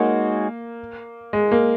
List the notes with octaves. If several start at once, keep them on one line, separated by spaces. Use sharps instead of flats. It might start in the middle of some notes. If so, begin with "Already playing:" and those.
Already playing: G#3 A#3 D#4 F#4 C#5
G#3
A#3